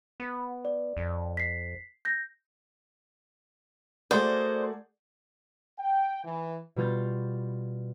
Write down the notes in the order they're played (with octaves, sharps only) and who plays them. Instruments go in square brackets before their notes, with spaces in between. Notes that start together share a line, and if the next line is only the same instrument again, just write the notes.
[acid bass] B3
[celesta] D5
[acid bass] F2
[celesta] B6 C7
G6 A#6
[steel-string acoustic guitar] A3 F#4 A#4 [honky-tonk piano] G#4 D5 F#5 [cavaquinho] C5
[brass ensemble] G5
E3
[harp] B2 G3 F4 G6 A6